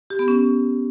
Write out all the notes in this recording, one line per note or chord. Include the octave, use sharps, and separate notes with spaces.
G4
B3
C#4